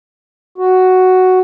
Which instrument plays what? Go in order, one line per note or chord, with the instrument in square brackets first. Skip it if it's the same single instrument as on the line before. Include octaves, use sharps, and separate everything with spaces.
[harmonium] F#4